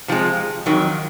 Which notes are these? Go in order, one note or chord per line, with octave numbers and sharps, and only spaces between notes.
C3 F3 G#3
F2 D#3 F#3